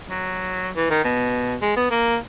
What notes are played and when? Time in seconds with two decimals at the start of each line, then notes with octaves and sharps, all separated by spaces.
0.09 F#3
0.76 E3
0.90 D#3
1.04 B2
1.61 G#3
1.76 B3
1.90 A#3